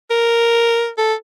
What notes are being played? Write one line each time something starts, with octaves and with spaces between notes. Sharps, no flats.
A#4
A4